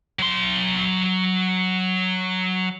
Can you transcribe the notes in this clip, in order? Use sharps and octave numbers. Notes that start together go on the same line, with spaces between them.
F#3 C6